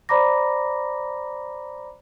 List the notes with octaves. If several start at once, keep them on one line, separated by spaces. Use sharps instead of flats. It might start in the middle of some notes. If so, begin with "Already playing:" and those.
C5 D5 A#5 B5 D6 A#6